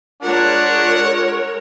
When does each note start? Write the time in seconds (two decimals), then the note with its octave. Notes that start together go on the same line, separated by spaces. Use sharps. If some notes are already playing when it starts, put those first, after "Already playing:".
0.23 G#3 D4 F4 A#4 C#5 F#5